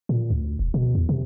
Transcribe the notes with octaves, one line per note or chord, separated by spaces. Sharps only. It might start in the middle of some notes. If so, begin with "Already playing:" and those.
A#2
D2
E1
B2
E2
C3